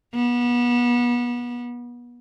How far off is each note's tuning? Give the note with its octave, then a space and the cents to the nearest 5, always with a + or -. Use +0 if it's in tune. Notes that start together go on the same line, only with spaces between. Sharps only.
B3 -30